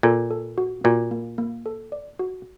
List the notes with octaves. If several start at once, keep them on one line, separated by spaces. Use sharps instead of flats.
A#2 A4
A4
F#4
A#2 F#4
A#3
A#3
A4
D5
F#4